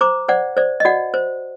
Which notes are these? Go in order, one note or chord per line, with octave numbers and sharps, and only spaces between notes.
C5 A#5 D6
C5 D5 F#5
C5 D5
D#5
F#4 D5 F#5
C5